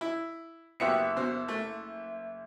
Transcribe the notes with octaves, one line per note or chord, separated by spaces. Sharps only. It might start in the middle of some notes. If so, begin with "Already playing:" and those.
E4
F#1 B3 F#4 G4 E5 C#7
B2 C5
A3